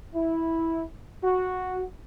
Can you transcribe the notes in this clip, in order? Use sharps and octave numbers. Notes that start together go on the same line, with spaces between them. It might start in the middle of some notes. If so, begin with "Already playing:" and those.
E4
F#4